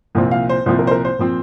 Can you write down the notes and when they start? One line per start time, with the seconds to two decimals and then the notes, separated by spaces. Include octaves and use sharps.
0.15 C2 A#2 F3 C4
0.31 F5
0.50 C5
0.66 C2 A#2 F3 C4 C5
0.79 A#4
0.87 C5
0.91 A#4
1.05 C5
1.19 A#2 F3 C4